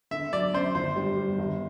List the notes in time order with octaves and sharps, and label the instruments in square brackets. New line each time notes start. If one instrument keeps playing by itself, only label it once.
[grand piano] D3 [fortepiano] E5
[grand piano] F#3 [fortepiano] D5
[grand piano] F#2 [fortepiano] C5
[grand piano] G1 [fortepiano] C5
[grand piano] G3
G3
G1